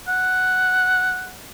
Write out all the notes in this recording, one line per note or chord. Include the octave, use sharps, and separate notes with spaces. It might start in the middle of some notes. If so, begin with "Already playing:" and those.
F#5